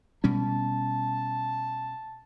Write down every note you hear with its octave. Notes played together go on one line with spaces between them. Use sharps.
B2 G3 C#4 A5